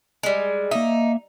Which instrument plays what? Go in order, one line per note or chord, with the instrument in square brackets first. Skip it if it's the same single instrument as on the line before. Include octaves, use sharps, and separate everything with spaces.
[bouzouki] G3 G#3
[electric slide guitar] A#3 E5 [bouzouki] D#4